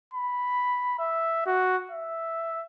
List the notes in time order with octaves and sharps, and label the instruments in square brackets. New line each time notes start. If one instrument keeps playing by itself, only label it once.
[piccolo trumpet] B5
E5
F#4
E5